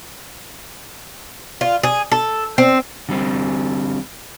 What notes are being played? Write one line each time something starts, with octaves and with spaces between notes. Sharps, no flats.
F4
G#4
A4
C4
D3 G3 C4